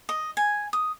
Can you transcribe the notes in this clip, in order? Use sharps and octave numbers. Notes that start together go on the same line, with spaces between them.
D#5
G#5
D#6